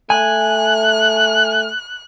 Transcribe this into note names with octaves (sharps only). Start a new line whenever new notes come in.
A3 G#5 F#6